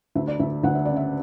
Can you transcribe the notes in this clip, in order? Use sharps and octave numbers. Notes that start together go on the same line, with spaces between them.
D2 E5
D5
D2 E5
D2 F#5
E5
C#3 D5
E5